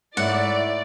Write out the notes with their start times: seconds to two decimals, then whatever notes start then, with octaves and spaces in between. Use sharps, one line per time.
0.17 G#2 A3 E4 C#5 D5 F#5